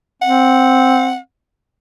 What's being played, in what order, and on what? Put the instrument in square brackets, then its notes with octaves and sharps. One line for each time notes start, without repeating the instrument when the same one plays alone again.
[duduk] C4 [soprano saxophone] F#5